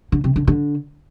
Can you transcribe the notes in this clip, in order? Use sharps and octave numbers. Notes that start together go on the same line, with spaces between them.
D3
C3
D3
D3